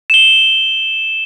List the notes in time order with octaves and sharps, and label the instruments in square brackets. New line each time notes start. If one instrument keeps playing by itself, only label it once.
[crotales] E7 G7